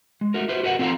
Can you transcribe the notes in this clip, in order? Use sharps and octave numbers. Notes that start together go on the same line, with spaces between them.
G#3
A3 F#4 A#4
F#4 B4 C5
F#4 A#4 B4 E5 F#5
C4 F4 A4 B4 F5 A#5